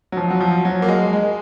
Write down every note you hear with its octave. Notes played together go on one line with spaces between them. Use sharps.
F#3
F3
F#3
F3
F#3
A#3
G#3
G#3